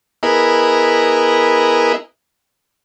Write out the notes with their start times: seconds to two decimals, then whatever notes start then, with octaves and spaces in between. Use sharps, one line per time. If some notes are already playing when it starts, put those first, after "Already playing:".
0.23 B3 E4 G#4 A#4 D#5